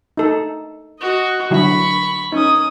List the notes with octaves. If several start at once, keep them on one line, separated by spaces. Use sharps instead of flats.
D#4 A4
F#4 D#5
D3 F#3 E4 B5 C#6
C#4 D#4 D#6